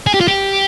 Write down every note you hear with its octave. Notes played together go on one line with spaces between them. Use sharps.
G#4
G4
F4
G4